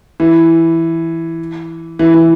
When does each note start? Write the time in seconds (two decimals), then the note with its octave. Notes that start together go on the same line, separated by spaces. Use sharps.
0.20 E3
1.99 E3
2.14 E3